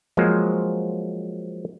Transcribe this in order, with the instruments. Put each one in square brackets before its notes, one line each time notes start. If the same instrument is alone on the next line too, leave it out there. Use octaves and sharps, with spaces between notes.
[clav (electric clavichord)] F3 F#3 G#3 A#3 C5